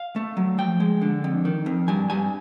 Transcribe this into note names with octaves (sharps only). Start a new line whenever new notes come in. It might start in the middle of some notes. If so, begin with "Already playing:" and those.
Already playing: F5
A3
F#3
F3 G5
G#3
D3
F2
D#3
F2
G2 G#5
G2 G#5